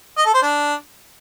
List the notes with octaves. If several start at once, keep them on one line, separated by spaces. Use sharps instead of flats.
D#5
A4
C5
D4